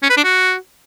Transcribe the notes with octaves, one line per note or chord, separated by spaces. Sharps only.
C#4
B4
D4
F#4